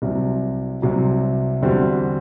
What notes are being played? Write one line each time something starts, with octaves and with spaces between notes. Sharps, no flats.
C2 C3 F#3
C2 C3 F#3
E2 D3 G3 C4 F#4